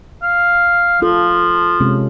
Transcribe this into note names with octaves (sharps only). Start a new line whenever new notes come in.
F5
F3 F4 A4
C3 G#3 C#4